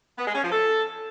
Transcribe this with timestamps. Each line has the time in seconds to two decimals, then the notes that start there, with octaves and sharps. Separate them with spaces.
0.18 B3
0.26 G#3
0.35 C#4
0.43 F3
0.52 A4